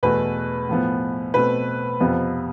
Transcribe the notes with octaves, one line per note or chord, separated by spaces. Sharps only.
E2 B2 A3 B4
A2 F3 B3
B2 A3 C4 B4
F2 C3 F3 B3